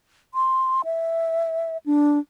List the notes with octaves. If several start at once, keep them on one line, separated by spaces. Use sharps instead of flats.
C6
E5
D4